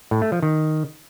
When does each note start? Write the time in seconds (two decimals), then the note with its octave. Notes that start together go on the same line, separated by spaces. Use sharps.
0.11 A2
0.22 A3
0.32 F3
0.43 D#3